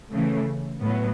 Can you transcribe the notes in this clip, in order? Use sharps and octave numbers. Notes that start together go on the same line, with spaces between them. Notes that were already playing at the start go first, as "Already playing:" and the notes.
C#3 E3 A3
A2 F#3 B3